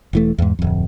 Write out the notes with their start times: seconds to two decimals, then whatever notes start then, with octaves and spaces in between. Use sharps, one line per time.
0.13 E1 E3 A3
0.38 E2 G#2
0.59 D1 F2